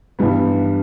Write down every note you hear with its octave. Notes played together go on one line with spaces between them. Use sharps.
G2 E3 G3 B3